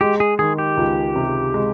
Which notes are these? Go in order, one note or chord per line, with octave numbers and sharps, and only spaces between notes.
G#3 G4
G#4
D#3 G#4
G4
C#2
C3
G#3